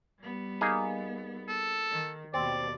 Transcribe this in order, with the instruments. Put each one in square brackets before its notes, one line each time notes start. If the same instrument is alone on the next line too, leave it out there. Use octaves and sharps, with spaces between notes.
[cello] G3 B3
[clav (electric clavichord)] A#3 D#4 G#4
[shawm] A4
[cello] D#3
[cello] D#2 B2 [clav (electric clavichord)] C4 [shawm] D5